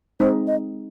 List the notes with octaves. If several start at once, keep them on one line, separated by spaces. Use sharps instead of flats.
G#3 C4 D#4 C5
D#5